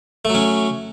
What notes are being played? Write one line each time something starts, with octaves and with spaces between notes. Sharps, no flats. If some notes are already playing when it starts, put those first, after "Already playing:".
F#3 A3 C#4